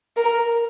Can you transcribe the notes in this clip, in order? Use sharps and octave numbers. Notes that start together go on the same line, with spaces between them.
A#4